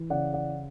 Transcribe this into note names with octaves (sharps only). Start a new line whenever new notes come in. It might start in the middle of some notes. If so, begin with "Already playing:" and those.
Already playing: E3
C#3 D5 F#5
D5 F#5